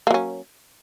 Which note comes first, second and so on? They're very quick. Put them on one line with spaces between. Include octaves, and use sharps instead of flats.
A#3 F#3 C#4